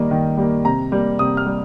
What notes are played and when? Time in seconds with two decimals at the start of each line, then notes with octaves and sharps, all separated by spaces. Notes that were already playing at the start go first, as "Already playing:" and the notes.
Already playing: D#3 G3 A#3 D#5
0.11 D#3
0.38 G3 A#3
0.65 C3 A#5
0.92 G3 A#3
1.19 C3 D#6
1.37 F6
1.46 G3